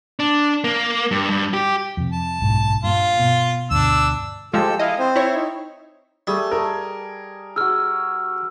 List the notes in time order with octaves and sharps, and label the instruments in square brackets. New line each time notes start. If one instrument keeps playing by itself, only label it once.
[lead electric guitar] D4
A#3
G2
G2
G4
[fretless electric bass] F2 C3
[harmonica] A5
[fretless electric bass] F#1 B1 G#2
[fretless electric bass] G2 A#2 [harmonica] F4
[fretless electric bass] B2
[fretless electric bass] D2 G2 B2 [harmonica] D4 E6
[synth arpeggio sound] F3 G#3 F4 [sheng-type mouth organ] G4 A4 E6
[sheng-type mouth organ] E4 F5 [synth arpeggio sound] D#5
[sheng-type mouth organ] C4 C5
[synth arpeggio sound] E4 C#5
[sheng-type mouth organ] D#4
[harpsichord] G3 [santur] A3 G#4
[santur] G#4 A5 [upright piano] A#4
[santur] F#4 G#4 [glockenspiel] E6 F6